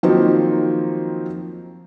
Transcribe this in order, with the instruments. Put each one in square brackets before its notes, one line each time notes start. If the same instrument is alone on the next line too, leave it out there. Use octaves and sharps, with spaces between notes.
[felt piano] D#3 F3 F#3 A#3 C4 D#4